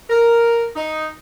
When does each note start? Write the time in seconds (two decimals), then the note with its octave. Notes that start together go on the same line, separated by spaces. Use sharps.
0.09 A#4
0.76 D#4